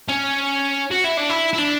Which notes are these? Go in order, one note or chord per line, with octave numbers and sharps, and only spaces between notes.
C#4
F#4
E4
D4
E4
E4
D4